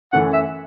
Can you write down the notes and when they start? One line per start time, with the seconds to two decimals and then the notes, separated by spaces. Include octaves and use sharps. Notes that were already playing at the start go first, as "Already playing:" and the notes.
0.13 F#2 E3 A3 C#4 F#5
0.33 E5